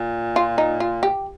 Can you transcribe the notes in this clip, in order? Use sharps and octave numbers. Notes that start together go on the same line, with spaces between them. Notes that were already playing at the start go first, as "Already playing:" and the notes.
Already playing: A#2
F4
D#4
F4
G4